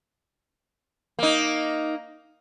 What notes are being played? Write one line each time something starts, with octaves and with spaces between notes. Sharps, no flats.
A#3 D#4